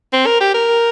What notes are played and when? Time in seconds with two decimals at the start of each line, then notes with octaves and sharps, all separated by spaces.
0.13 C4
0.26 A#4
0.40 G4
0.54 A#4